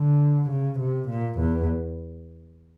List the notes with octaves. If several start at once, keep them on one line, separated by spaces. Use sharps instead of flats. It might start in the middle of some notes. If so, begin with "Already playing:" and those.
Already playing: D3
C#3
C3
A#2
E2